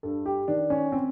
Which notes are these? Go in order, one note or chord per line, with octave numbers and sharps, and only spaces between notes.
G2 A4
G4
D#3 D4
C#4
C4